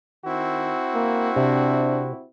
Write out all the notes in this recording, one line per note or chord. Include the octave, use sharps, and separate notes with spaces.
D#3 C4 E4 F#4
A#3
C3 D4